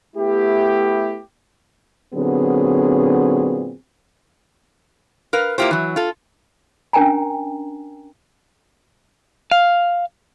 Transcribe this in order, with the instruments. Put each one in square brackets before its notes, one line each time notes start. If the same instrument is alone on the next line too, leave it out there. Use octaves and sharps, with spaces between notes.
[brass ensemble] A3 B3 E4 G4
[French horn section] A#2 D3 F#3 B3 C4 G#4
[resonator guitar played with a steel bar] A#4 B4 F5
A#3 E4 F4 G4 C5
E3 F#3
F4 A4
[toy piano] C#4 D4 A#4 G5 G#5 A#5
[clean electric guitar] F5